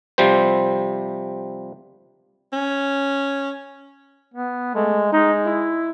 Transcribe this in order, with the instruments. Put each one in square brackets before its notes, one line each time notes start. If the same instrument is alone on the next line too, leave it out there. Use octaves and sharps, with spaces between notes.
[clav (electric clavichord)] C3 F3 G3 C4 C5
[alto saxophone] C#4
[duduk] B3
[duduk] G#3 [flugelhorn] A3
[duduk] G#3 [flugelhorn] D#4
[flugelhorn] E4